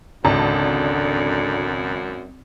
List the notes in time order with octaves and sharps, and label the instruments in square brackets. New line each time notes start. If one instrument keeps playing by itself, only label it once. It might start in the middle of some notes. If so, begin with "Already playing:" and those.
[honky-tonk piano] G#1 A5 [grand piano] C#2 [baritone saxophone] F#2 [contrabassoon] D3